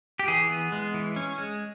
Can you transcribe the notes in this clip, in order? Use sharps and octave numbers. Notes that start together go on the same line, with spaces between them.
G4
E3 G#4
B3
G#3
E3
C#4
G#3